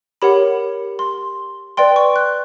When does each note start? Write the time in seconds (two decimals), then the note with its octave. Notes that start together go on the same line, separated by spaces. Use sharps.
0.22 G4 A#4 C#5 F#5 B5
0.99 C6
1.77 B4 D5 G5 C6
1.96 C#6
2.16 F#6